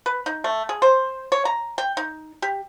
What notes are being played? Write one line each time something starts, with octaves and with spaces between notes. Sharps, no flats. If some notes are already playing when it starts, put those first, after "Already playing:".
B4
D#4
A3
G#4
C5
C#5
A#5
G5
D#4
G4